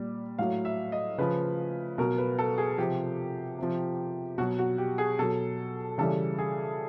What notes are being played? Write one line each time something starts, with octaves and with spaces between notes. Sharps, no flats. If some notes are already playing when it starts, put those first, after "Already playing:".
Already playing: A#2 G3
A2 F#3 F5
E5
D#5
C#3 F3 B4
B2 F#3 A#4
B4
A4
G#4
C3 F3 G4
C3 F3
B2 F#3 F#4
F#4
G4
G#4
B2 F#3 A4
C#3 E3 G3 A4
G#4